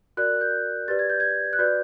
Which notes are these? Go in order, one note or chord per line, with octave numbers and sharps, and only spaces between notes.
F#4 A#4 D5 F#6
G6
G4 B4 D5 A6
G#6
G6
G#6
F#6
F#4 B4 D5 G6